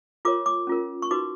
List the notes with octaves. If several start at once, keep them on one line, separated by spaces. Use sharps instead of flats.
F4 A#4 C#5 D6
D6
C#4 F4 A#4
C#6
D#4 F#4 B4 D6